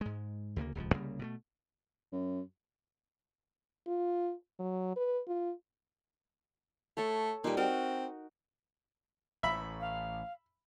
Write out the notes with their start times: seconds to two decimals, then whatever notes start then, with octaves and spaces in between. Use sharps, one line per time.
0.01 G#2 G#3
0.56 D2 C#3 A3 A#3
0.75 D#1 C#2 C#3 F3
0.94 C2 C#3 G3 A#3
1.19 B2 G3 A3
2.12 F#2
3.87 F4
4.60 F#3
4.96 B4
5.28 F4
6.97 A3 A4 C#5
7.44 A#2 G3 D#4
7.57 C4 F#4 A#4 D#5
9.43 A1 A2 E5 B5
9.80 F5